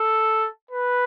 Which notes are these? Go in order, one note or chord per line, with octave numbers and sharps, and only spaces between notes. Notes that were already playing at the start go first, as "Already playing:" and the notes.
Already playing: A4
B4